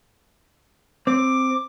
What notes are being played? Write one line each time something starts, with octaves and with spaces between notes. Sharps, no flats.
C4 D6